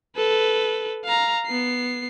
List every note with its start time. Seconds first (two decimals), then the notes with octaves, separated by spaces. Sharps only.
0.16 A4 B4
1.04 F5 A#5
1.47 B3 C7